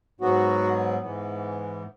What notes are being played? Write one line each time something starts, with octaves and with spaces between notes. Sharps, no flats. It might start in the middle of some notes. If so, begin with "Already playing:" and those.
G#2 F#3 B3 F#4
G#2 E3 B3